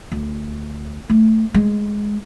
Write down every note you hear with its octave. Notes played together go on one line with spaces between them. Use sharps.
D2
A3
G#3